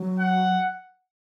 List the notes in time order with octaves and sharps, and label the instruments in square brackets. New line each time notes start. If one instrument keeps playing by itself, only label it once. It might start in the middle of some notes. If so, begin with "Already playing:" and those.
Already playing: [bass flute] F#3
[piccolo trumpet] F#5